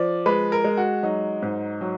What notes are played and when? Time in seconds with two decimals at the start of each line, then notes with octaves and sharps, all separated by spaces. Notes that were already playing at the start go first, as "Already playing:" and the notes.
Already playing: F3 D5
0.26 G#3 B4
0.52 A#4
0.64 G#3
0.77 F#4
1.03 F#3 D#4
1.42 G#2
1.81 F#3